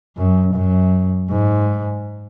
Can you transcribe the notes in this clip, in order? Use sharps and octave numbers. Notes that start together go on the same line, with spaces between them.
F#2
F#2
G#2